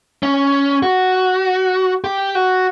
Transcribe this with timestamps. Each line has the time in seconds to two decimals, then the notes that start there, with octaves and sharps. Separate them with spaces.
0.23 C#4
0.83 F#4
2.04 G4
2.35 F#4